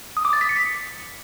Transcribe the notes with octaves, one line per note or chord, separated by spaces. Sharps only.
D#6
D6
A6
B6
C#7